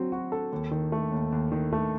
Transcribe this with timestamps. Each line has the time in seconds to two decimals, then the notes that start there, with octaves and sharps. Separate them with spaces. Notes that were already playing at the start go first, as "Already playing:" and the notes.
Already playing: F#3 C4
0.12 F#4
0.32 A4
0.52 D#2
0.71 D#3
0.92 A3
1.12 D#2
1.32 D#2
1.52 D#3
1.73 A3